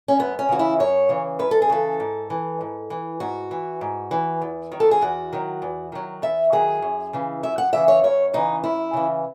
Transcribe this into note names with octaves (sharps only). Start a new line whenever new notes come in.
C#4
F#2 B3
C#4
C#3 E3 F#4
E4
F#2 C#5
C#3 E3
F#2 B4
A4
G#4
C#3 E3 A4
G#2
E3
G#2
E3
G#2 F#4
E3
G#2
E3
E2
D#3 F#3
A4
G#4
E2 F#4
D#3 F#3
E2
D#3 F#3
E2 E5
D#3 F#3 G#4
F#2
C#3 E3
F#2 E5
F#5
C#3 E3 E5
C#5
F#2 C#5
C#3 E3 D#4
F#2 E4
C#3 E3